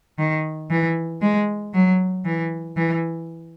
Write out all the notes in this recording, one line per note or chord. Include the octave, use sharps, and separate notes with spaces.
D#3
E3
G#3
F#3
E3
E3